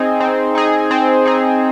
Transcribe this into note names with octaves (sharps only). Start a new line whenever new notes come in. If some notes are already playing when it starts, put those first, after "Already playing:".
Already playing: C4 D#4 G#4
C4
D#4 G#4
C4
D#4 G#4